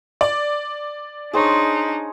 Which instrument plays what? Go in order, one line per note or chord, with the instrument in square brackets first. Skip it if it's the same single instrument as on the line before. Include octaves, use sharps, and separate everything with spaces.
[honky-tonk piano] D5
[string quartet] D4 D#4 [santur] G#4 C5 C#5